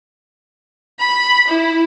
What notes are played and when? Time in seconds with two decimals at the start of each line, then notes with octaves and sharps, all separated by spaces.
1.00 B5
1.48 E4